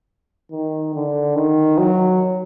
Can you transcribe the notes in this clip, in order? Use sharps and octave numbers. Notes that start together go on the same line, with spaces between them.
D#3
D3
D#3
F#3